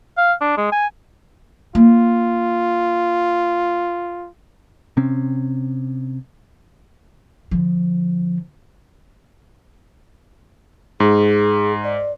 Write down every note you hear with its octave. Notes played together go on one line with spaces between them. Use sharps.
F5
D4
G#3
G#5
A#3 F4
C3 C4 C#4
D3 F3
G#2 G#4
D5